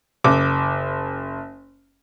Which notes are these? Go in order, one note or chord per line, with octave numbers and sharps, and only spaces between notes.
F#1 D6